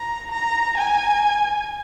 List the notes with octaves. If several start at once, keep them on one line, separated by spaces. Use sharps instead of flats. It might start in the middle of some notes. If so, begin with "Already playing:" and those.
Already playing: A#5
A#5
G#5